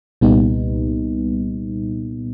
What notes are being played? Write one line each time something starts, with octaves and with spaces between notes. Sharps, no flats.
C2 A#2 G3 B3 D#4